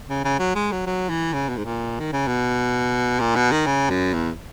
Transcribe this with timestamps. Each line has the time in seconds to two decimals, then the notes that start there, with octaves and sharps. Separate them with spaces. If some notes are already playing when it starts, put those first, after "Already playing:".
0.09 C#3
0.25 C#3
0.39 F#3
0.55 G#3
0.72 F#3
0.87 F#3
1.10 E3
1.33 C#3
1.49 B2
1.57 G#2
1.65 A#2
2.00 D#3
2.13 C#3
2.27 B2
3.20 A#2
3.36 B2
3.52 D#3
3.67 C#3
3.90 F#2
4.14 E2